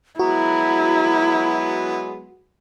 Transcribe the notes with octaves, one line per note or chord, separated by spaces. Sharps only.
F#3 G#3 B3 E4 F#4 A#5